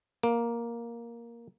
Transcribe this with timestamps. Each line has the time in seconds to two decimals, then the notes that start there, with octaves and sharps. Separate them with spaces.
0.23 A#3